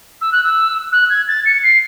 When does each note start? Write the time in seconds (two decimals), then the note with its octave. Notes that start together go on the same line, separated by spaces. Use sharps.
0.21 E6
0.32 F#6
0.43 E6
0.92 F#6
1.09 G#6
1.27 A6
1.45 C#7
1.63 C7